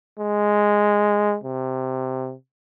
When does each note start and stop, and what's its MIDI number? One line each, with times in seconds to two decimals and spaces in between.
0.20 1.37 56
1.44 2.34 48